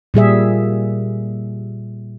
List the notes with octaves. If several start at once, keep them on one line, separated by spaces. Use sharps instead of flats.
A#2 G3 G#4 E5